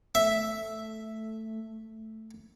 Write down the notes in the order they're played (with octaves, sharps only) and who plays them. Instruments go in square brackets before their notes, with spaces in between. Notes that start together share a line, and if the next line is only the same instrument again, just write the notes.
[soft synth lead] A3 [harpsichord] E5